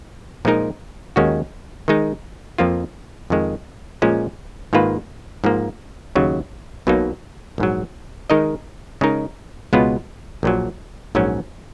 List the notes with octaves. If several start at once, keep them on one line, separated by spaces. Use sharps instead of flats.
A#2 F3 G#3 D#4 A#4
D#2 D#3 G#3 C#4 F#4
D#3 G#3 D#4
F2 F3 A#3 F4
F2 D#3 G#3
A#2 F3 G#3 C#4
G#2 D#3 A#3 F4 B4
G#2 F3 A#3
D#2 C#3 F#3
B1 B2 F#3 A#3 D#4
A#1 G#2 F#3
D#3 G#3 D#4 A#4 D#5
C#3 G#3 D#4 A#4
C#2 B2 G#3 B3 F4
A#1 A#2 F#3
A#1 G#2 F#3 C#4